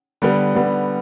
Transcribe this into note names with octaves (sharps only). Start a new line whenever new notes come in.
D3 G3 B3
D3 G3 B3